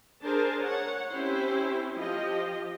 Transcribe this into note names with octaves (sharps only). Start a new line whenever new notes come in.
D4 G#4 A#4 C5 A5
C#5 F#5
C4 C#4 E4 G4 C5
F3 G4 D#5